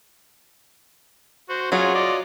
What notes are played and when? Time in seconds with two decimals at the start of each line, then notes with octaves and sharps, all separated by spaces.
1.50 F#4 C5
1.72 F#3 C#4 F4 F#4 G#4
1.95 F4 D5 D#5